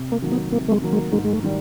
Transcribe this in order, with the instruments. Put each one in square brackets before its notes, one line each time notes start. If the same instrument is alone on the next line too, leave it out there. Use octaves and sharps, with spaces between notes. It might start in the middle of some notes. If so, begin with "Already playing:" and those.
Already playing: [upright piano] C3
[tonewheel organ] A#3
[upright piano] D#3 F#3 A#3
[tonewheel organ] B3
[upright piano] C3 [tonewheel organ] A#3
[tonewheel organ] A3
G#3
[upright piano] D#3 F#3 A#3
[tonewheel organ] G#3
[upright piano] G#2 [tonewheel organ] G#3
[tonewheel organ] G#3
A3
[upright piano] D#3 G3